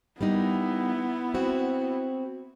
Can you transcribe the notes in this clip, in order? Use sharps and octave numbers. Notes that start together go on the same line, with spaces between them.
G3 A#3 B3 D#4 E4
C4 F#4